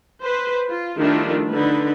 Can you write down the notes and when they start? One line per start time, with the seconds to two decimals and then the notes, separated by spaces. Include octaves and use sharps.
0.21 B4 C5
0.69 F4
0.97 D#3 F3 G3 A3 D4 E4
1.51 D3 D#4 B4